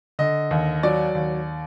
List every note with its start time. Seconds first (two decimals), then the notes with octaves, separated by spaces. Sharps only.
0.19 D3 D#5
0.51 D#2
0.83 F#3 D5
1.15 D#2